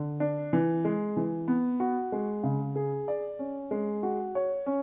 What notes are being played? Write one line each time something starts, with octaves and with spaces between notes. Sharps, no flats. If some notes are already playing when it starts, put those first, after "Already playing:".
Already playing: D3
D4
E3
G#3
E3
B3
F#4
G#3
C#3
G#4
D5
C#4
G#3
F#4
C#5
C#4